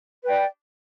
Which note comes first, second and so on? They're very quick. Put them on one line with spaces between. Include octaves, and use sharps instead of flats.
B4 G5 D5